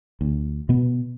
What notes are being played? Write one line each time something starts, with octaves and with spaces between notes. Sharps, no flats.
D2
B2 B3